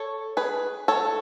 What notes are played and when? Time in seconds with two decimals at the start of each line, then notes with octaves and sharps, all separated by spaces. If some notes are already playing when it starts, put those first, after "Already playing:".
Already playing: A4 C#5
0.37 G#4 B4
0.88 A4 C#5